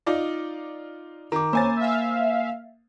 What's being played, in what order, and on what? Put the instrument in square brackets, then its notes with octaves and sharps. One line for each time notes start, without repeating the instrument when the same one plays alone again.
[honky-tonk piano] D#4 F4 D5
[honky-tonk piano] D#3 [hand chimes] A#5 D6
[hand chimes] A#3 [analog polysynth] C#4 [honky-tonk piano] C5 G#5 A6
[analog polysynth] E5 F5